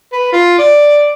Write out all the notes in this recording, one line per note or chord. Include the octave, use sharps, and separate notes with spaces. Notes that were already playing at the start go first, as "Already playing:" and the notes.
B4
F4
D5